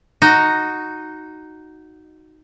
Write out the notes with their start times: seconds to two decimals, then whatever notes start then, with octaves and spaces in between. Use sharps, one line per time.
0.22 D#4 F#4 D#5